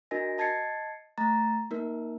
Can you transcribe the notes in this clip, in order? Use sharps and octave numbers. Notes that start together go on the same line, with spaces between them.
D4 F#4 A#4 D#5 G#5 A#6
D#5 A5 G#6 A6 C7 C#7
A3 A#5 A6
A#3 D#4 A#4